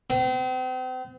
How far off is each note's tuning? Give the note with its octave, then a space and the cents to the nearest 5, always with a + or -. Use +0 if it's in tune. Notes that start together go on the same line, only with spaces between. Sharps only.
C4 -40